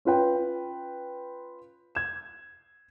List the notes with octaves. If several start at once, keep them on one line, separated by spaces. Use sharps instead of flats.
C#4 F4 B4 G5
G#6 E7